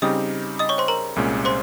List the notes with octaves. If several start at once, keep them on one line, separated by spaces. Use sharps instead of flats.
C#3 G3 C4 D#4 G4 D#5 D#6
D#5 D#6
C#5 C#6
C5 C6
A#4 A#5
C2 A#2 G#3 C#4
C5 C6